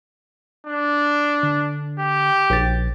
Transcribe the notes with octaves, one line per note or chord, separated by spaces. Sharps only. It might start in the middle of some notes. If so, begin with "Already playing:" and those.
D4
D3
G4
A#1 A6